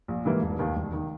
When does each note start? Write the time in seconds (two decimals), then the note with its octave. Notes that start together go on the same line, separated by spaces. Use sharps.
0.08 A#1
0.25 G#2 E3 G3 A#3
0.42 E1
0.59 D#2 D#3
0.76 E1
0.93 D#3